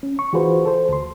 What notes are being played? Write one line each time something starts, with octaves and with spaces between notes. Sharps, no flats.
C#4
C#6
E3 F4 F#4 G#4 B4 C5
A4 C5
D2 C6